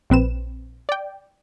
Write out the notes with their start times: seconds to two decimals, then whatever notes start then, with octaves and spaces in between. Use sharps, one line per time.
0.10 A#1 C4 B4 E7
0.89 D5 G5